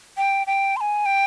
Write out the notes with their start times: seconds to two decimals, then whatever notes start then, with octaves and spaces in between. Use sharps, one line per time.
0.17 G5
0.47 G5
0.76 C6
0.81 G#5
1.06 G5